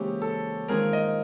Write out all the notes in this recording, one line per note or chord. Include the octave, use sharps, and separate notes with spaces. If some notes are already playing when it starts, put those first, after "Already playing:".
Already playing: C#3 E3 G#3 A#3 C4 E4 G4
A4
D#3 G#3 C4 F4 G#4 A#4
D#5